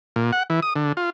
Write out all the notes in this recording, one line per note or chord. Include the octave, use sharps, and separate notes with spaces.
A#2
F#5
E3
D#6
D3
F4